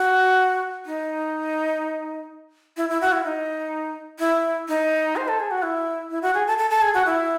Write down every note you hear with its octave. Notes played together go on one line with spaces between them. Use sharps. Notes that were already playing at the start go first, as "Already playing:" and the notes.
Already playing: F#4
D#4
E4
E4
F#4
E4
D#4
E4
D#4
C5
A4
G#4
F#4
E4
E4
F#4
G#4
A4
A4
A4
G#4
F#4
E4